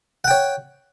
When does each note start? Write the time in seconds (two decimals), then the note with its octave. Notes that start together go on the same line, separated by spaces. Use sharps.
0.24 F#5
0.28 G5
0.31 C#5